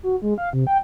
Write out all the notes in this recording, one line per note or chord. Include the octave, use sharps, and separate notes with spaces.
F#4
G#3
F5
C3
G5